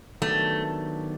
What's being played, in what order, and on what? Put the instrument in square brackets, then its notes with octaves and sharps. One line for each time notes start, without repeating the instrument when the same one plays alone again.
[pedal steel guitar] D#3 F#3 B3 D4 G4 [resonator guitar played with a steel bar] A3